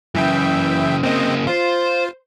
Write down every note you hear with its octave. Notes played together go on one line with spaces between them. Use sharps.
F#2 C#3 E3 E5 G5
C#3 A#3 C4 D#5
F4 C5